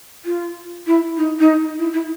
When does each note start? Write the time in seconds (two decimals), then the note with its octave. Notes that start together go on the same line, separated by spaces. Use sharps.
0.25 F4
0.86 E4
1.17 D#4
1.39 D#4
1.78 E4
1.93 E4